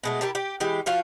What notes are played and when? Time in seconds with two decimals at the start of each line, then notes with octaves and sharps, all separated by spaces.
0.03 B2 G#3 A3
0.21 E4 G4 A#4 A5
0.35 G4
0.60 E3 G#3 G4
0.86 F3 F4 F#4 F5